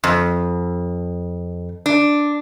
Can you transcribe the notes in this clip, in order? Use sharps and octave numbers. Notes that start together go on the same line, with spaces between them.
F2
D4